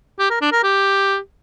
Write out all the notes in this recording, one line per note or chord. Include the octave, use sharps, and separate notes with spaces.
G4
A#4
D4
A#4
G4